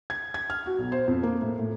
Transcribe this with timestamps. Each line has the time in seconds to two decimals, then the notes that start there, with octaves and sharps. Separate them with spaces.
0.10 G#6
0.34 G#6
0.50 F6
0.66 F#4
0.79 B1
0.92 C5
1.08 F2
1.23 A#3
1.42 A2
1.59 A2